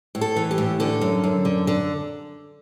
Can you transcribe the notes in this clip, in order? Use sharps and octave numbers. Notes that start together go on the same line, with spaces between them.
A2
A4
E3
G4
A2
D3 A4
F#2
F#2
D3
D3